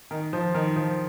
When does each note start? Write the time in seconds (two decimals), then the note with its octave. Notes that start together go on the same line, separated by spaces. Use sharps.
0.11 D#3
0.33 F3
0.54 D#3
0.76 F3